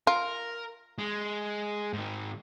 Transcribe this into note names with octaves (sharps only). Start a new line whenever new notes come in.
F4 A#4
G#3
G#2 D#3